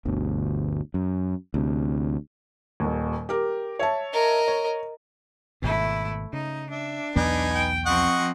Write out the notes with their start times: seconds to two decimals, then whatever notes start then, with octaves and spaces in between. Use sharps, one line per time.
0.05 G1 D2 B2
0.94 F#2
1.54 D2 C3
2.80 D#1 D#2
3.29 G4 A#4
3.79 C#5 E5 A5
4.13 A#4 D#5
4.48 C#5
5.62 G#1 B2 A3 E4
6.33 C#3 D#4
6.71 D4 E5
7.16 B1 E2 B3 D#4 B4 G#5
7.53 G5
7.86 F3 C4 D#5 F#5 C#6